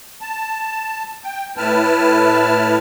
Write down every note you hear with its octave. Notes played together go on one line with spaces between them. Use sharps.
A5
G5
A2 E4 B4 A5 F6